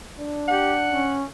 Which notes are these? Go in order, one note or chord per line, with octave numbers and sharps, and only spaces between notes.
D4
G4 F#5
C#4